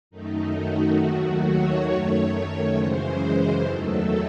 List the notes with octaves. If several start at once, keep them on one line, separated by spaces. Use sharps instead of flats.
F#2 D#3 A3 D#4
F#4
D#2 D#3 F#3 A3
C#5
F#2 D#3 A3 C#5
F#2 C#3 E3 G#3 C5
E2 D#3 F#3 A3 A4